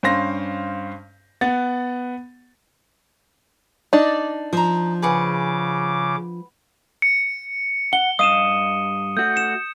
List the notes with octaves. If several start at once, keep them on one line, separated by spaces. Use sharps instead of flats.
G2 C#4 C5 F5 A#6
B3 F#5 A6
D4 D#4 D5
F3 A#5 D#6
C#3 G#4 B4 F#5 D6
C#7
F#5 G7
G2 D#5 F5 D#6 D#7 E7
A3 F#4 G6
C#7 E7